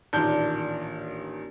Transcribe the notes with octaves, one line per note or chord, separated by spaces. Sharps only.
A1 A#2 D#3 D4 G6